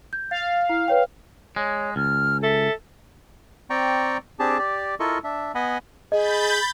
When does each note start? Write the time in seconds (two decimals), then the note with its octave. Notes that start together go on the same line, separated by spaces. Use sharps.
0.13 G6
0.31 F5 A6
0.69 E4
0.88 B4 C#5 G5
1.56 G#3 C#5
1.96 C#2 F6
2.43 A4 E5
3.70 C4 D5 G5 A#5 C#6
4.39 C4 D4 G4 G#4 A5
4.59 G4 D5
5.00 E4 F4 A4 A#4 D#5 C#6
5.24 D4 E5
5.55 B3 D#5 F#5 G#5 B5
6.12 G#4 D#5 B5 G6 A6